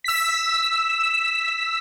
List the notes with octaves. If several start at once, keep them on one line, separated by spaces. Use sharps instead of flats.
E6 B6